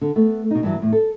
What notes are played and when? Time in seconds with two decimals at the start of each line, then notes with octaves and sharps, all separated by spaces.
0.01 D3
0.16 A3 B3
0.51 B2 D#4
0.63 G2 E3 F#3
0.79 E2 A2
0.92 A4